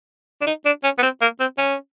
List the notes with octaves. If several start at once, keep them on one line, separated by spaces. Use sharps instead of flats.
D4
D#4
D4
C#4
B3
C4
A#3
C4
C#4